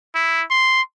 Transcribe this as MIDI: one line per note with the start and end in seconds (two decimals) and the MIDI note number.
0.15 0.42 64
0.51 0.81 84